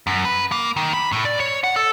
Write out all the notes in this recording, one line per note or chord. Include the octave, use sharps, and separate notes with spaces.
F#2
B4
A#3
D#3
B5
A2
D5
C#5
F#5
A4